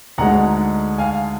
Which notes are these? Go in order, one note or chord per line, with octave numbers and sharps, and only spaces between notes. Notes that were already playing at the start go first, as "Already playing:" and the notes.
D2 D3 G#3 D#4 F#5 A#5
F5 G#5